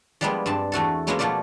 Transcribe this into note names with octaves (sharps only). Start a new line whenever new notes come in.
F3 G3 G#3 A#3 B3 G#4
G2 C4 A5
E2 A3 F#4 A4
F#3 G#3 A#3 B3 C#4 E4
B2 F3 A3 A#3 D5